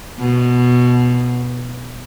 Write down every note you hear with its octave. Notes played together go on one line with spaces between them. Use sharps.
B2